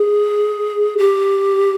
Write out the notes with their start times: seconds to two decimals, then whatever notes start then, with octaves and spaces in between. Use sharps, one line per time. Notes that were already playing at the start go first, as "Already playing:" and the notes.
Already playing: G#4
0.98 G4